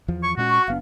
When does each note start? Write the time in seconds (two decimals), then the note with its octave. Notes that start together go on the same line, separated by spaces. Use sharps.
0.08 E2 F3
0.23 C#6
0.37 A#2 G#3 C#4 F#4
0.50 C#6
0.68 F#1 B3 D4 F5